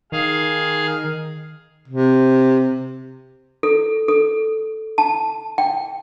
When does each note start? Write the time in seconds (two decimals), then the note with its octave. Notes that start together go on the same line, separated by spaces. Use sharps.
0.12 D#3 G#4 F5
1.88 C3
3.63 A4
4.08 A4
4.98 A5
5.58 G5